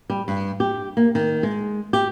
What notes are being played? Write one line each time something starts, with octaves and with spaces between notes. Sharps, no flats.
G3
G2
G4
A#3
D#3
G#3
G4